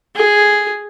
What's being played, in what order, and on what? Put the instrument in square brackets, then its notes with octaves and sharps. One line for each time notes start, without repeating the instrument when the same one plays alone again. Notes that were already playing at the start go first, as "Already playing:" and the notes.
[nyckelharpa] G#4